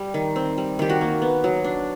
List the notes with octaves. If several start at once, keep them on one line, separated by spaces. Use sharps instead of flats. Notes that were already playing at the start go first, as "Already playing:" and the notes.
Already playing: G3
D#3
C4
G3
D#3 G4
F#4
A#3
B3
F#3
D4